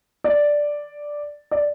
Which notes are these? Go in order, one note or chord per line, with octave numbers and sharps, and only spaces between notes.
D5
D5